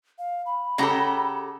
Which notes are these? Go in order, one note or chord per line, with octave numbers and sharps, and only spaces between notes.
F5
B5
C#3 G4 A4 F#5 G5 A#5